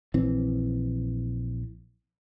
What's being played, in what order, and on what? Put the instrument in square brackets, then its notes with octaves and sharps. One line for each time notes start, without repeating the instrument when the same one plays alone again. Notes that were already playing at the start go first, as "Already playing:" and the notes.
[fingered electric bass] A#1 E3 C4